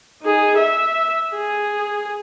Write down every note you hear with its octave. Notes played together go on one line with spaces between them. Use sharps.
D#4 G#4
E5
G#4